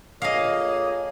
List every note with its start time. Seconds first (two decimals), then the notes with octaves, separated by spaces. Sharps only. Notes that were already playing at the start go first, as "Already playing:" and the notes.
0.22 A#3 F4 G#4 A4 C#5 D#5 F5